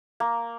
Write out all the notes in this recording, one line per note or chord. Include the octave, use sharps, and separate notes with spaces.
A#3